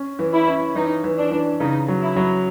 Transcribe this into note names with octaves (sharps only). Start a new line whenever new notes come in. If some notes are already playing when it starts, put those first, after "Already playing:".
Already playing: C#4
E3
E4
C#4
E3 D#4
E3
D4
E3
C#3 D#4
F#3
E4
F#3